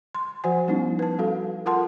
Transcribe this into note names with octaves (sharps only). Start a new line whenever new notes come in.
C6
F3 F#4 C5 F#5 G#5
G3 B3 C#4 D#4 E4
B4 A5
G3 F#4 A4 F5
F4 A#4 F#5 A5 C6